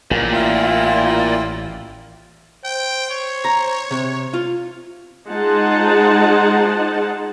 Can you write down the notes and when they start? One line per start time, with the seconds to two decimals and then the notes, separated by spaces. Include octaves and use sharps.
0.11 A1 A#2
0.33 E4 F4 G5
2.64 C5 G5
3.10 C#5
3.44 A#5
3.91 C3
4.34 F4
5.28 G#3 D#4 F4 C5 F#5 A5